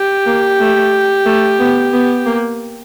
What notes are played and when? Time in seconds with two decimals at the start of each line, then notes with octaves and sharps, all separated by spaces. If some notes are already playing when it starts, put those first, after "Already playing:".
Already playing: G4
0.26 A#3
0.60 A3
1.26 A3
1.59 B3
1.93 B3
2.26 A#3